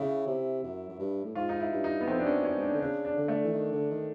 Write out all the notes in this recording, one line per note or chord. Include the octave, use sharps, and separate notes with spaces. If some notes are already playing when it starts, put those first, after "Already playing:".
Already playing: C#3 E4
C3
F#2
F#2
G2
A2
G#2 F4
D#4
E4
G2
D#4
B3
F2 C4
D4
G2 C#4
F#2
C#4
G#2
D4
D3
C#3 D4
D4
D3
A3
E3
D#3
D3
D#3